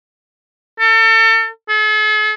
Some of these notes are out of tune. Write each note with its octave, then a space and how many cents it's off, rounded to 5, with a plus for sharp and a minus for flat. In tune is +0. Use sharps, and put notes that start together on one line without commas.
A4 +35
A4 -45